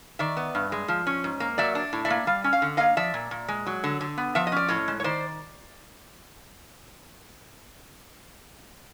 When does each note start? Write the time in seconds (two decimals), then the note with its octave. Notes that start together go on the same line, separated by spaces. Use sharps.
0.19 D#3 D5 E5
0.37 B3
0.55 G2
0.72 G#3
0.88 F3
1.07 C#4
1.24 G#2
1.40 A#3
1.58 F#3 D5 E5
1.75 D4
1.93 A2
2.05 D5 E5
2.10 A#3
2.27 G3 F5
2.44 C#4
2.53 F5
2.62 D3
2.77 A#3 D#5 F5
2.97 F3 D5 E5
3.14 A#2
3.31 A#2
3.48 G#3
3.66 F#3
3.84 D3
4.01 D3
4.18 B3
4.35 F3 E5
4.47 D#5
4.52 C#4 D5
4.68 A2 C#5 D#5
4.88 G#3
5.00 C#5
5.04 D#3 C5 D5